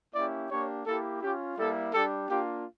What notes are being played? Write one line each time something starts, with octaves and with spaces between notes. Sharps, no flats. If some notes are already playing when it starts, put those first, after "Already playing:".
A#3 C#4 E4 G4 D5
A#3 D4 G4 C#5
A#3 E4 G4 A4
C#4 F4 G4
G3 A#3 E4 A4
G3 D4 G4 A4
A#3 D4 F4 G4